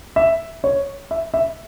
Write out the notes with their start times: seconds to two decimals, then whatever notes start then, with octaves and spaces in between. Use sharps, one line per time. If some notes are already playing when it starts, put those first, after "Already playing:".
0.16 E5
0.64 C#5
1.11 E5
1.34 E5